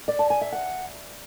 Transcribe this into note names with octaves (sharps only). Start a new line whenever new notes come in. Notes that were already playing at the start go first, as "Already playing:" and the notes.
D5
A5
G#5
E5
F#5